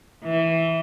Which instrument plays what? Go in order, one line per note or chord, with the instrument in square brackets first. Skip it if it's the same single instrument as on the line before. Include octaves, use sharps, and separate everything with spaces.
[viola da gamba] E3